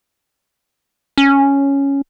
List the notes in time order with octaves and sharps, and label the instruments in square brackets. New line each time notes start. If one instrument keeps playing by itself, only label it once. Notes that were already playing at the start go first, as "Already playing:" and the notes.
[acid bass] C#4